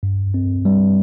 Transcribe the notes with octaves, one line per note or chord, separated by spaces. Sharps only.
G2
C4
G3